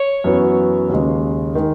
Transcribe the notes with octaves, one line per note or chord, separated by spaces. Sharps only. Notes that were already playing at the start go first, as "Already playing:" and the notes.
Already playing: C#5
F#2 E3 B3 F#4
D#2 C#3 G#3
D#3 G#3